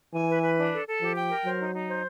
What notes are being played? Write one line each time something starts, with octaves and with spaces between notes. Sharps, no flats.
E3 G#5
B4
B4
D4
A4
A4
F3 G4
G5
A#4
F#3 C5
D#4
D#4
C5